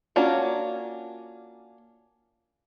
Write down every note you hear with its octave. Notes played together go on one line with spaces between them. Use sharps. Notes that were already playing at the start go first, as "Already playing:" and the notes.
A#3 C#4 D4 F4 F#4